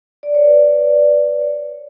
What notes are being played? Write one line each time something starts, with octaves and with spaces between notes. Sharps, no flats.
D5
C#5
B4
C#5
C#5